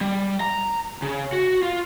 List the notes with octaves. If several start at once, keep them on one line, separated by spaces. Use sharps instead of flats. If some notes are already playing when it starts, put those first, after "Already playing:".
G3
A#5
C#3
F#4
F4